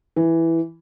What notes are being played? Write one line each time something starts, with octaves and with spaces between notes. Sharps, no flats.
E3